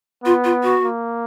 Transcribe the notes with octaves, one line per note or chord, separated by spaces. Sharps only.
B3 F4
F4
F#4
A#3